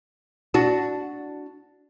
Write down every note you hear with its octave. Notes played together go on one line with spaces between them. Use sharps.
D4 F#4